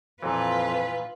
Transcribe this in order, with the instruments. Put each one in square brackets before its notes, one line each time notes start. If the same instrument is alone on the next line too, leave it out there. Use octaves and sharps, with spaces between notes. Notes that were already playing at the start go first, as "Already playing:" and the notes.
[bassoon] F2 [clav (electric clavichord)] A#2 E3 [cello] F4 B4